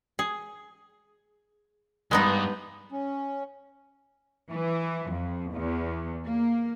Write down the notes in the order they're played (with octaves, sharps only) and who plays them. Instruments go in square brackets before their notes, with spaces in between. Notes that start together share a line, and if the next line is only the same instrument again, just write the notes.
[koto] G#4
[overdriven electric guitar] D2 G2 [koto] G#3 B3 D#4
[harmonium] C#4
[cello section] E3
F2
E2
A#3